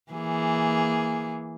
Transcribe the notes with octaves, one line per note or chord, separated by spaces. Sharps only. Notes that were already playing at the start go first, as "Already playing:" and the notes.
E3 A#3 G#4